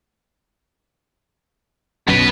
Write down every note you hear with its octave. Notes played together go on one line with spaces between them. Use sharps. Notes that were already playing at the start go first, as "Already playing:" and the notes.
B1 F#2 B2 B4